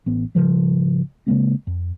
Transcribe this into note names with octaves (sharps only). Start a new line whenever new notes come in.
A1 B3
G#1 C#3 F3 G3
C#3 G#3 A#3 C4
F2